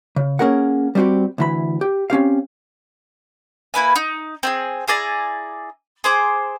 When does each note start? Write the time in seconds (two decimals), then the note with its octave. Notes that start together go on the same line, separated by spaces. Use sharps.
0.16 C#3
0.39 A#3 C#4 G#4 A#4 F#5
0.95 G3 B3 C4 F#4 G4
1.38 D2 E3 B5
1.81 G4
2.10 C4 C#4 G4 F5
3.74 A#3 E4 B4 G#5
3.96 D#4
4.43 C4 F4 G#4
4.88 E4 G#4 D5 A#5
6.04 G#4 C5 D6